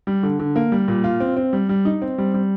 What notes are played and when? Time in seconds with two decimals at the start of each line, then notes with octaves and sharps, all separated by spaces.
0.07 G3
0.23 D3
0.39 D3
0.56 A#3
0.72 G3
0.88 A#2
1.04 F4
1.20 C4
1.37 C4
1.53 G3
1.69 G3
1.85 D#4
2.02 C4
2.18 G3
2.34 G3